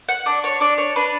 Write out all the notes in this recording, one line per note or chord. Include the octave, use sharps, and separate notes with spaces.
F#5
D4 D5
C#5
D4 D5
C#5
D4 B4